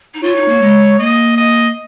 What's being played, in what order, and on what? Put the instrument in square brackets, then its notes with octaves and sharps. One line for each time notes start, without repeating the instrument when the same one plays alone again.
[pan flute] D#4
[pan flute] F4 [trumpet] C#5
[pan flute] D#4
A#3
G#3
[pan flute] A#3 [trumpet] D#5
[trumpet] D#5